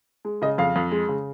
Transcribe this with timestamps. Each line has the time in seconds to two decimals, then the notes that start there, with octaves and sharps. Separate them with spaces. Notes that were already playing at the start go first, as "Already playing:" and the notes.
0.25 G#3
0.42 C#3 D#5
0.58 F2 F5
0.76 F2
0.91 G#3
1.08 C#3